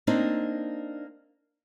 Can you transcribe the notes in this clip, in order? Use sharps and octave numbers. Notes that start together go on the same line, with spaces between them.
A#3 C4 D4 D#4